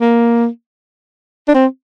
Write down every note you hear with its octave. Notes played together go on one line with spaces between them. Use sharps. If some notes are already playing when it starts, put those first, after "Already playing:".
A#3
D4
C4